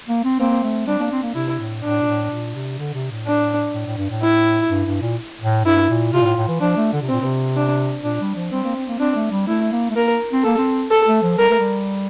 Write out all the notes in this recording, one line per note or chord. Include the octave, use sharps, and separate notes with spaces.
A#3
C4
A#3 C4
A3
G3 D4
A#3
C4
A#3
C3 E4
A2
A2 D4
A#2
A2
A#2
C3
D3
C3
A2
D4
A2
A2
G2
A2
E4
G2
G2
A#2
A2
G2 E4
A#2
C3 F4
A#2
A2
A2
E3
F3 D4
A3
D3
C3
A#2 C4
C3
D4
A#2 D4
G3
F3
G3 C4
A#3
C4
A#3
C4 D4
A3
G3
A3 E4
A#3
A3
A#3 A#4
C4
A#3 A4
C4
A4
A3
F3
G3 A#4
A3
G3